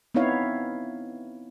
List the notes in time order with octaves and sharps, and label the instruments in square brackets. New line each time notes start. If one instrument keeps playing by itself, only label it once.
[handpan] B3 C4 D#4 E4 C#5 F5